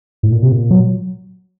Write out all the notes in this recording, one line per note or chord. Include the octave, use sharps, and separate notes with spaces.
A2
A#2
C3
A#2
F#3